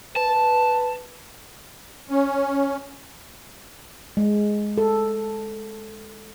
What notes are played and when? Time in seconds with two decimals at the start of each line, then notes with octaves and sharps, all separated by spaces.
0.16 B4 A5
2.10 C#4
4.17 G#3
4.78 A4